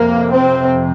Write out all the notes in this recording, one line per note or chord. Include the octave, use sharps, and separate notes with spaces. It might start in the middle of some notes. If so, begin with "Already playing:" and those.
Already playing: F2 C3 A#3
C4